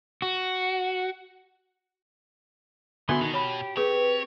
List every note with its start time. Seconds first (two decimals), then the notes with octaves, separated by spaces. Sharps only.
0.22 F#4
3.09 D3 B3 D#4 E4 F#4 G#5 C6
3.21 B2 D#3
3.34 G4 C#5 B5
3.77 C4 G4 G#4 B4 C#5